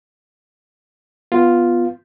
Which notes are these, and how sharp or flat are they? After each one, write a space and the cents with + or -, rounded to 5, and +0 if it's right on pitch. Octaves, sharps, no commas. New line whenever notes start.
B3 +0 F4 +0